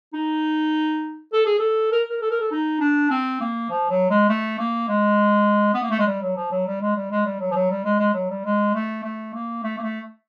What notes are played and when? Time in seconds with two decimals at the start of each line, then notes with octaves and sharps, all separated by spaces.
0.13 D#4
1.33 A4
1.46 G#4
1.59 A4
1.92 A#4
2.10 A#4
2.22 A4
2.31 A#4
2.40 A4
2.52 D#4
2.80 D4
3.11 C4
3.41 A#3
3.70 F3
3.90 F#3
4.10 G#3
4.29 A3
4.59 A#3
4.88 G#3
5.74 B3
5.82 A#3
5.90 A3
5.99 G#3
6.07 G3
6.22 F#3
6.37 F3
6.52 F#3
6.66 G3
6.81 G#3
6.96 G3
7.11 G#3
7.26 G3
7.40 F#3
7.51 F3
7.55 F#3
7.70 G3
7.85 G#3
7.99 G#3
8.14 F#3
8.30 G3
8.45 G#3
8.74 A3
9.04 A3
9.34 A#3
9.63 A3
9.78 A#3
9.83 A3